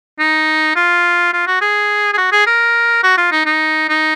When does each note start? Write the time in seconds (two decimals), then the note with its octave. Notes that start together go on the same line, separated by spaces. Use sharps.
0.19 D#4
0.76 F4
1.33 F4
1.47 F#4
1.61 G#4
2.13 G#4
2.18 F#4
2.32 G#4
2.46 A#4
3.03 F#4
3.17 F4
3.32 D#4
3.46 D#4
3.89 D#4